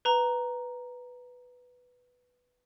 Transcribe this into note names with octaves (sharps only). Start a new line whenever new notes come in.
B4 A#5